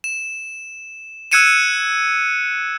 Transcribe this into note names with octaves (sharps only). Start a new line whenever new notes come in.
E7
E6 F#6 G#6 C#7 D#7 E7